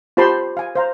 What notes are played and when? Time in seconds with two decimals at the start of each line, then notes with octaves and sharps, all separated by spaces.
0.17 F4 G4 C5 A5 B5 C6
0.57 F5 G#5
0.75 C5 F5 A#5